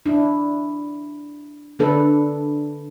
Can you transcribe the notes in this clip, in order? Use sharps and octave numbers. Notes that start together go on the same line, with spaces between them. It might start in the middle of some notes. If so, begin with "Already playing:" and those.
D4 E4
D3 D4 A4 B4